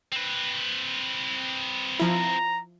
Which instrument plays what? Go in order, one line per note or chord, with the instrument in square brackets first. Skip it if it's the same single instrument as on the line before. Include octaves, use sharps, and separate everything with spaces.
[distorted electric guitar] C4 B4
[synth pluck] F3 E4 [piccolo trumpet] A#5